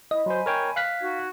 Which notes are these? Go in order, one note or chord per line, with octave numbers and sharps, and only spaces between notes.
E4 D#5
F#3 C5 G#5 B5 C6
A#4 C#5 G5
F5 F#6 B6
D#4 F#4 G#6